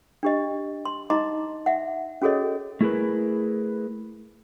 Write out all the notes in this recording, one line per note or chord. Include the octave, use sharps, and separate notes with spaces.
D4 G4 D#5
C6
D#4 D#5 A#5 C6 D6
E5 F#5
C#4 F#4 G#4 A4 C#5 D#5
A3 E4 G#4 A#4 B4